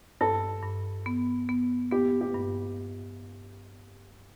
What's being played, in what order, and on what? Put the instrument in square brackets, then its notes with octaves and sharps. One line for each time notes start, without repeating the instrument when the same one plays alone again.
[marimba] G2 [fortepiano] A4
[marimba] G2
B3
B3
[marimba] B3 [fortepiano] G4
[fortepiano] G4
[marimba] G2